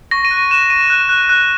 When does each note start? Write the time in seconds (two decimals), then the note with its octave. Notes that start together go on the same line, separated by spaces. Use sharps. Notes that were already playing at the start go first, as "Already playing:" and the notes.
0.11 C#6 A#6
0.25 D#7
0.31 F#6
0.37 D#7
0.51 F#6 E7
0.70 C#6 D#7
0.90 F#6
1.09 F#6
1.29 F#6